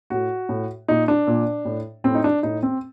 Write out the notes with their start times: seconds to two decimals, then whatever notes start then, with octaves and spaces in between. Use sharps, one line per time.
0.10 A2 F#4
0.49 A2
0.88 A#2 D#4
1.08 D4
1.27 A#2
1.65 A2
2.04 A2 C4
2.15 D#4
2.24 D4
2.43 A2 D#4
2.63 C4